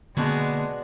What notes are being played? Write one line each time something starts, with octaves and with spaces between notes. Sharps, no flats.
B2 D3 G#3 A#3 B3 D4 F#4